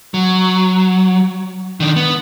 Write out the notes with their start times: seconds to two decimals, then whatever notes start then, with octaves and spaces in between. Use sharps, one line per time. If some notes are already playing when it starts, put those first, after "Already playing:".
0.14 F#3
1.80 D#3 D4
1.96 B3